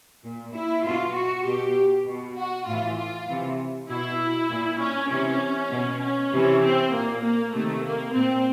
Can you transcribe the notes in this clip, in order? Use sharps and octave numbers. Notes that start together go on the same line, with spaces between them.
A#2
E4
B2 F4
F#4
B2 G4
B2
F#4
A2 E3 F4
F4
C3 E3
B2 E4
A#2
C#4
C3 E3 C#4
B2
C#4
C3 E3
C4
A#2 A#3
A#3
C3 D#3 A3
A#3
A#2 C4